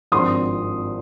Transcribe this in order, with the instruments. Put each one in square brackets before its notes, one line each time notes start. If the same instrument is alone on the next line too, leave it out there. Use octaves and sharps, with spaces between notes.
[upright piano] G#1 G2 F3 G#3 C4 C6 D#6